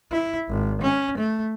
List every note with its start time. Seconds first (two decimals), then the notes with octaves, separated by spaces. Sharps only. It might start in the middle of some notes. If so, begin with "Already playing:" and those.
0.11 E4
0.50 G#1
0.81 C#4
1.17 A3